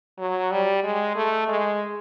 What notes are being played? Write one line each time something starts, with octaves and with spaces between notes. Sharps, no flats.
F#3
G3
G#3
A3
G#3